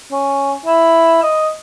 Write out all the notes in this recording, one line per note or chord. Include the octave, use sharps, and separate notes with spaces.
C#4
E4
D#5